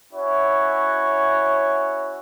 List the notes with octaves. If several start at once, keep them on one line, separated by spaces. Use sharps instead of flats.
C#4 E4 F#4 C#5